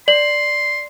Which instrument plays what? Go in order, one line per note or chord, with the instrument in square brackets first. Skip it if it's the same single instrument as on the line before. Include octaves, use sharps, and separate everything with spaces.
[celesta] D5 F#7 [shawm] C6